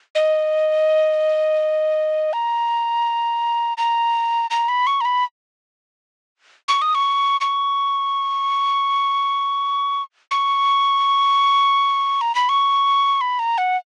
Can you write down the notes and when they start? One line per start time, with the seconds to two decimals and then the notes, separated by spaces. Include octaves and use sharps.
0.15 D#5
2.33 A#5
3.78 A#5
4.51 A#5
4.68 B5
4.87 C#6
5.01 A#5
5.05 B5
6.68 C#6
6.82 D#6
6.95 C#6
7.41 C#6
10.31 C#6
12.21 A#5
12.35 B5
12.49 C#6
13.21 B5
13.39 A#5
13.58 F#5